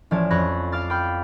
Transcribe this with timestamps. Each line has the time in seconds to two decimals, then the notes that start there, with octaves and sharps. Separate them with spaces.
0.11 A1 F3 C#4 D5 A5 G#6
0.30 F2 C#5 B5 F#6 A6 A#6
0.72 F5 D6 F6 A6
0.90 G5 B5 F6 G6